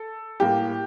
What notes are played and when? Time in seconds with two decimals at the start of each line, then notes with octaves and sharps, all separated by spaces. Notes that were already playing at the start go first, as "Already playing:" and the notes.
Already playing: A4
0.40 A2 G3 A#3 G4